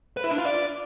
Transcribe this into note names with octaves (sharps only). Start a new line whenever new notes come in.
B4
E4
D4
F4
D5